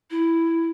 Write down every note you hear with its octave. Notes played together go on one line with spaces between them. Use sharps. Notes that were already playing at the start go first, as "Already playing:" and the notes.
E4